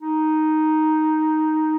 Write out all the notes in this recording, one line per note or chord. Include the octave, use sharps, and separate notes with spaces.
D#4